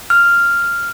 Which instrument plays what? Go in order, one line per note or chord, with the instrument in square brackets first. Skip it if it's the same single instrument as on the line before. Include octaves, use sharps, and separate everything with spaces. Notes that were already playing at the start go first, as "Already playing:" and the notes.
[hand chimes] F6